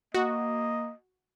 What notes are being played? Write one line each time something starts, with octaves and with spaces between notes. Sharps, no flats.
A#3 F#4 D#5